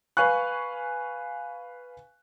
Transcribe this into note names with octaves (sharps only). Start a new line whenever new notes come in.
B4 F5 G#5 C#6 F#6